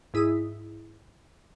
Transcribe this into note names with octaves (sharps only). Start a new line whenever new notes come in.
G#2 E4 G#4 D#6 B6